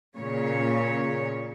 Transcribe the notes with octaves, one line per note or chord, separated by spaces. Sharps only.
A#2 C#3 C#5